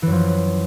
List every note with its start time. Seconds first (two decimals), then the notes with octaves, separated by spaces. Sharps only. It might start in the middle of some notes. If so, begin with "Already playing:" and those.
0.02 E3
0.07 F#2
0.12 F3